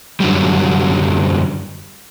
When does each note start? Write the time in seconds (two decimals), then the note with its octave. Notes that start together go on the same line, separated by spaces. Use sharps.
0.20 F#2 D3 F#3 G3